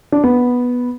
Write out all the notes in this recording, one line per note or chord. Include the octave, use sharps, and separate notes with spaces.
D4
B3